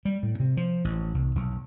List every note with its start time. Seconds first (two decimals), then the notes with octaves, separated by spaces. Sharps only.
0.05 G3
0.23 A2
0.40 C3
0.57 F3
0.85 A1
1.14 C2
1.35 B1